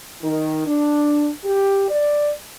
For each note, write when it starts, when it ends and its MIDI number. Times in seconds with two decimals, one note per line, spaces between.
0.22 0.62 51
0.66 1.28 62
1.44 1.87 67
1.88 2.30 74